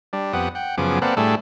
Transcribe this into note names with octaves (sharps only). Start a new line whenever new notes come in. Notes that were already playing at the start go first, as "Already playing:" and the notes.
G3 D4
F2 B3 G4 F#5 D#6
F#5 G5
F#2 C#3 F3 B3 G#4 D6
A#3 C4 A4 B4 D5 F#5
A2 G3 A3 D4 G#4 A4